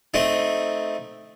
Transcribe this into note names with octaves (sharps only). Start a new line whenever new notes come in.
A3 C4 D#4